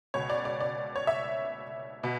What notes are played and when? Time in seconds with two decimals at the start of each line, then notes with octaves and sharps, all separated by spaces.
0.14 C#2 B2 C#5
0.30 D5
0.45 D5
0.60 D5
0.96 C#5
1.07 E5
2.03 B2